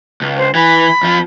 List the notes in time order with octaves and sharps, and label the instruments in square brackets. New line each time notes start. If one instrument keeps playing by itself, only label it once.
[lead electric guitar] C#2
[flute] C5
[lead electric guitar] E3 [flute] B5
[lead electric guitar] F2 F3